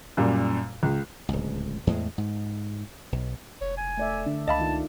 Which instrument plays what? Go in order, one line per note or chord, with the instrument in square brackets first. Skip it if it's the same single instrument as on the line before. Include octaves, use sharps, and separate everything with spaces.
[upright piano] F#2 A#2 G3
C#2
[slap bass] D1 C#2
E2 A2 G#3
G#2
B1
[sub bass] F1 [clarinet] C#5
[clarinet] G#5
[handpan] A3 D5 E5
[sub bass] D3 [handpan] D4
[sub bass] C#2 [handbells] D#5 F5 B5 [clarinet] A5
[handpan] D#3 F4